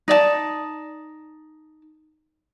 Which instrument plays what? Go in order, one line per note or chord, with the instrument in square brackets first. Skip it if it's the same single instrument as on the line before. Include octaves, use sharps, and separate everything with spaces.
[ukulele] D#4 D5 E5 A5